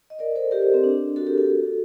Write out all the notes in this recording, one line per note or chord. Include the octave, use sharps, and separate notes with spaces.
D#5
A#4 D5
A4 C5
G4 A#4
G4 A#4
C4
D4
F#4 A4
G4 A#4
F#4 A4